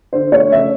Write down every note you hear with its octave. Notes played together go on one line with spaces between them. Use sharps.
D3 C5
A3 C#5
C#3 E5